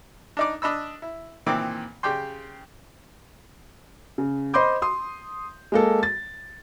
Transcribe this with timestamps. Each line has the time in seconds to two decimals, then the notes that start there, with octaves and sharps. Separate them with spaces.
0.37 D4 D#4 D5
0.62 D4 D#5 B5 E6
1.02 E4
1.46 A#2 D#3 E3 C4 D6
2.03 C#3 G4 D5 G5 C6
4.18 C#3
4.54 C5 D#5 B5 C6 D6 G6
4.82 C6 D#6
5.72 G#3 A#3 A4
6.03 A6